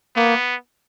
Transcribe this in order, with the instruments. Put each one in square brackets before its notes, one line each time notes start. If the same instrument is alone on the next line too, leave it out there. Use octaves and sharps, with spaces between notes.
[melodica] A#3 [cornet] B3